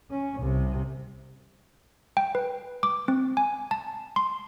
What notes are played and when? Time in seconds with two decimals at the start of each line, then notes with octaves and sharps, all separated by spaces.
0.11 C#4
0.39 C2 C3
2.17 G5
2.35 B4
2.83 D6
3.08 C4
3.37 G#5
3.71 A5
4.16 C6